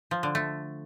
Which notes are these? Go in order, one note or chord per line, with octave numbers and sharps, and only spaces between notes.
F3
D3
A3